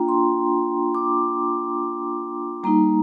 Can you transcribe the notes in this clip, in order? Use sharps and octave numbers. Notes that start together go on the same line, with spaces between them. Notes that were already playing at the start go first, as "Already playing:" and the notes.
Already playing: A#3 D4 F4 G5 A#5
C6
D6
G3 A#3 D#4 A#5